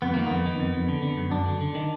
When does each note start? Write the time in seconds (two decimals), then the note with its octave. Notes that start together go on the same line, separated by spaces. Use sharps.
0.02 F2 B3
0.14 D#3 A#3
0.27 F2 B3
0.46 D#3
0.59 F2
0.74 F2
0.88 D3
1.02 D3
1.18 F#2
1.31 F#2 D4
1.46 D3
1.61 D3
1.75 D#3